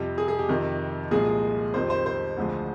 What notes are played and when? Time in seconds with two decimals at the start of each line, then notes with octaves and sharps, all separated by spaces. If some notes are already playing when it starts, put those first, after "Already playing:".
Already playing: F2 C3 G3 G4
0.18 G#4
0.28 G#4
0.39 G4
0.49 F2 C3 D#3
1.11 C2 A#2 F3 G#3 G#4
1.74 F2 D#3 G3 C5
1.90 C5
2.06 C5
2.37 D2 D3 F3 G#3